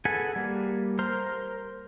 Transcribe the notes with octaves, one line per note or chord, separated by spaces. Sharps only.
G#4 A4 B4 F#5 G#5
G3 A#3
A#4 C5 A#5 C6